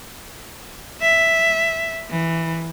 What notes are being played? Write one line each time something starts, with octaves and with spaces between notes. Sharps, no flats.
E5
E3